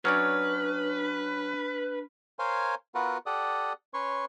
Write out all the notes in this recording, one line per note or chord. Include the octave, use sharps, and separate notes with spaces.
F#3 C#4 D4 B4 D5 F6
A#4 C5 C#5 F5 G#5 C6
B3 F4 F#4 A#4 B4 F#5
G4 A4 D5 F#5 D#6
C#4 B4 C#5 C6 C#6